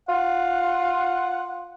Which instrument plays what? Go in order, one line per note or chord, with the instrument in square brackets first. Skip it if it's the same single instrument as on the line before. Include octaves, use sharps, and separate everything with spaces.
[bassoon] F4 [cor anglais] F#5